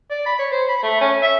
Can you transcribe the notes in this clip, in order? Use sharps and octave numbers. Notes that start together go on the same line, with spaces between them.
D5
B5
C#5
C5
B5
A3
C#4
E5